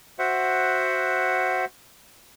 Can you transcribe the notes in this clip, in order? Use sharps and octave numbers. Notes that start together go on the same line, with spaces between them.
F#4 C5 E5 F#5